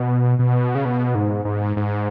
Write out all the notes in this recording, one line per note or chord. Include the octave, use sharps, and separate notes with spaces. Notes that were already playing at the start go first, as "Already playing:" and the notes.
Already playing: B2
B2
C#3
B2
G#2
G#2
G#2